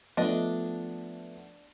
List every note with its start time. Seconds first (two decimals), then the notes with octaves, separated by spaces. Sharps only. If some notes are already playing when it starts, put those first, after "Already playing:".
0.17 F3 A3 B3 D4 D#5